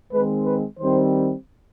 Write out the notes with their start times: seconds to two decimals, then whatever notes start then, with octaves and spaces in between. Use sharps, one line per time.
0.13 D#3 G#3 C4 B4
0.46 B4
0.80 D#3 G3 C4 C5